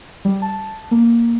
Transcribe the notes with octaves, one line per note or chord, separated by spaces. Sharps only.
G3
A5
A#3